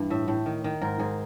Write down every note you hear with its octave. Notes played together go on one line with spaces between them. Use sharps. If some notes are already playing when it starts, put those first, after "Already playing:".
Already playing: G2 E3
A2 E5
A2
D#3
D#3
G#2 A#4
G#2 G#4